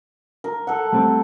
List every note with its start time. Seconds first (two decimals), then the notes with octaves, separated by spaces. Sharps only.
0.44 A#4
0.67 A4 F#5
0.93 G3 A3 C4